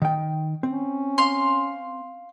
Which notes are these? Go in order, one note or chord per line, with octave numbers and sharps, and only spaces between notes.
D#3 G5
C4 C#4
F5 C6